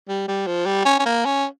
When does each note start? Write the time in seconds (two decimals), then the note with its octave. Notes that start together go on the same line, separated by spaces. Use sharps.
0.09 G3
0.28 G3
0.47 F3
0.66 G3
0.85 C#4
0.99 C#4
1.06 A#3
1.25 C#4